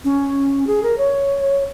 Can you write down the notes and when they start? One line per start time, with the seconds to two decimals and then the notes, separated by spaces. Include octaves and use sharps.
0.04 C#4
0.67 G#4
0.83 A#4
0.98 C#5